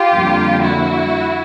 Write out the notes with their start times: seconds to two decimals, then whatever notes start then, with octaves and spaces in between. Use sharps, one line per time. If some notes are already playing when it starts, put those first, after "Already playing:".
Already playing: F4 G4
0.15 F2 D3 G3 A#3
0.62 E4 F#4